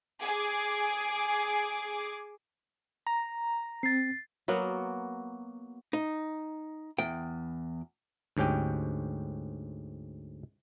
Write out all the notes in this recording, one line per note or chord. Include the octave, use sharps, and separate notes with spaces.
G#4 D6
A#5
C4 A6 C7
F#3 A#3 B3 F#4
D#4
E2 G5
D2 G#2 C#4 G4 G5